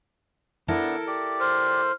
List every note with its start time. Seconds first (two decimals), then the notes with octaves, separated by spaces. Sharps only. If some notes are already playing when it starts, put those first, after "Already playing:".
0.68 B3 D4 E4 A4 A#4
1.07 G4 D5
1.40 C5 F6